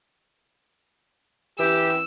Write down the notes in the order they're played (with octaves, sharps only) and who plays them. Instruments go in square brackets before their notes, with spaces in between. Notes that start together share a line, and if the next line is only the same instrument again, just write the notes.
[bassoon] E3 [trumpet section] G4 [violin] E6